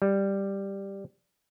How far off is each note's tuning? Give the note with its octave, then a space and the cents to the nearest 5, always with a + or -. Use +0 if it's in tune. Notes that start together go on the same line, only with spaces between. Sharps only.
G3 +5